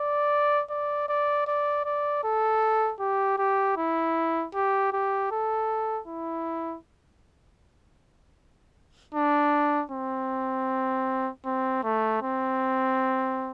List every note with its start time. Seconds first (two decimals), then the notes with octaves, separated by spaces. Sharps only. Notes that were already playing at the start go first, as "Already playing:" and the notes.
Already playing: D5
0.70 D5
1.09 D5
1.47 D5
1.85 D5
2.24 A4
3.00 G4
3.38 G4
3.77 E4
4.54 G4
4.93 G4
5.31 A4
6.07 E4
9.14 D4
9.92 C4
11.45 C4
11.84 A3
12.22 C4